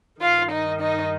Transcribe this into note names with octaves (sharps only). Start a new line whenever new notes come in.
G2 D#3 F4 F5
D#4 D#5
D#4 D#5